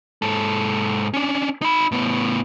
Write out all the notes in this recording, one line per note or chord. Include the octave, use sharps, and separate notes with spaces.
G#2 A4
C#4 D4
D#4 B5
A2 B3